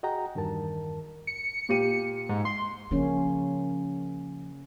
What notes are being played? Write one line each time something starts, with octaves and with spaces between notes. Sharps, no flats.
F#4 G#4 D#5 F#5 G5 A#5
E2 G2 D#3 A#4 A5
C#7
A#2 G4 D#7
G#2
C6
C#3 F3 A#3 C#4